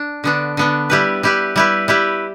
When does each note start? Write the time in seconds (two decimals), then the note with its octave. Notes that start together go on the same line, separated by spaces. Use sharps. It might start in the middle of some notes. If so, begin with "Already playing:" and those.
Already playing: D4
0.24 D3 B3 D4
0.57 D3 B3 D4
0.90 G3 E4 G4 B4
1.23 G3 E4 G4 B4
1.56 G3 E4 G4 B4
1.88 G3 E4 G4 B4